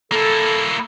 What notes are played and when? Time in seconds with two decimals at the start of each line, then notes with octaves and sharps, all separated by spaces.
0.12 A#3 E4 A4